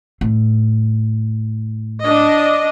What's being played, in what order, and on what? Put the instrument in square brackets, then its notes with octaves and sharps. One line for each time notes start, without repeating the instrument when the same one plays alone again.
[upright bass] A2
[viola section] D4 D#5